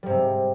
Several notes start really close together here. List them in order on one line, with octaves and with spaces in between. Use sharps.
G3 G#2 C3